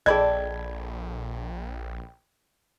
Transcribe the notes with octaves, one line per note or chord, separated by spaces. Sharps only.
A#1 G#4 A4 D5 D#5 G5 B5 G#6